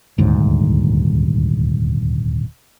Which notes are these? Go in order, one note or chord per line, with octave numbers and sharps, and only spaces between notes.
D#1 D2 G#2